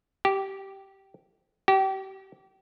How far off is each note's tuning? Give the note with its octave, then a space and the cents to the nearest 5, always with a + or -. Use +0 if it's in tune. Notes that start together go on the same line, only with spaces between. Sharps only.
G4 -15
G4 -35